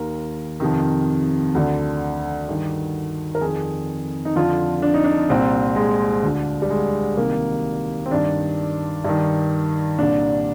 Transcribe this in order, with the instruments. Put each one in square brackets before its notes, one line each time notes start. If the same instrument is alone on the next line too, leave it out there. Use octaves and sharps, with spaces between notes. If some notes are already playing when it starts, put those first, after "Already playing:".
Already playing: [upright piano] D#2 D#3 A#4
F2 C3 D#3
D2 D3
G2 D#3
A#4
F2 D#3 G#4
D#4
F2 D3 F4
D4
D#4
D4
C2 A#2 C4
G#3
D2 D3
G3
G#3
C2 C3 D#3 A#3
C4
G2 D#3 D4
G2 D#3
C2 A#2 D4